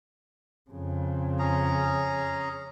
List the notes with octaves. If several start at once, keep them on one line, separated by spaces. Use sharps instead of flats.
F2 C#3
C#4 G#4 A#5